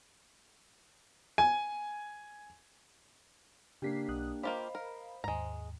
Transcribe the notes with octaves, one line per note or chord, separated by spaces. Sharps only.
G#5
C#3 A#3 D4 G4 B6 C7
B1 D#6 F#6
A#3 F4 G4 C5 D#5 F5 B5
A#4
D#2 G#2 G#3 A#5